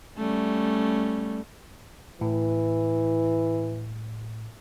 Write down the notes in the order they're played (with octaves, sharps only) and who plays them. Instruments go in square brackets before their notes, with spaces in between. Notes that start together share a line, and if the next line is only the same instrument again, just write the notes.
[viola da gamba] G3 A3 C#4
[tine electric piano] A2 [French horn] E3